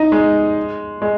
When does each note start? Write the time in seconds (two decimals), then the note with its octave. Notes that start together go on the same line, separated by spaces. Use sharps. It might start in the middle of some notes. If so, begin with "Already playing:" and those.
Already playing: D#4
0.12 G#3
1.02 G#3